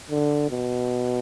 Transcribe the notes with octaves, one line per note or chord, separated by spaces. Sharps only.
D3
B2